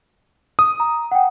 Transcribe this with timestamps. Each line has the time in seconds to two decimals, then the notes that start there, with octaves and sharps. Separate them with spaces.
0.59 D#6
0.80 A#5
1.11 F#5 G5